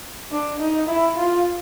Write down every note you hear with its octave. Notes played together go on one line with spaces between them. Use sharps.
D4
D#4
E4
F4